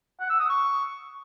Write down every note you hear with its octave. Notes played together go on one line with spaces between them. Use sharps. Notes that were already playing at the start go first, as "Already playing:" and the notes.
F#5
E6
D#6
C#6